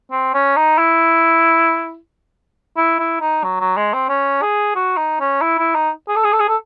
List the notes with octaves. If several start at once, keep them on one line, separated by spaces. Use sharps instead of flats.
C4
C#4
D#4
E4
E4
E4
D#4
F#3
F#3
G#3
C4
C#4
G#4
F#4
D#4
C#4
E4
E4
D#4
G#4
A4
G#4
A4
G#4
A4